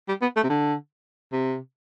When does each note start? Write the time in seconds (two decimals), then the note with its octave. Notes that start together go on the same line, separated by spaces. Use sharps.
0.08 G3
0.22 B3
0.36 A3
0.43 C3
0.49 D3
1.32 C3